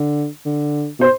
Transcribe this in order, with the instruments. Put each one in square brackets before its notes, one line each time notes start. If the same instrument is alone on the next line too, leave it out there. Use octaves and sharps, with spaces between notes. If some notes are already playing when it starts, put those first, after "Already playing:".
Already playing: [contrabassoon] D3
D3
[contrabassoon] B2 [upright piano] C5